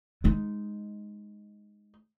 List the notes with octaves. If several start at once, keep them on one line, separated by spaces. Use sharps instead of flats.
G#3 D#4